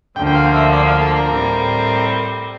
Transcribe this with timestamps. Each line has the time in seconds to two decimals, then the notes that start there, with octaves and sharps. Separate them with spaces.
0.16 D2 D3 F3 A#3 G5
0.27 G5
0.35 F5
0.54 E5
0.72 D5
0.87 F5
1.01 A4
1.16 A#4
1.30 A2 G3 C4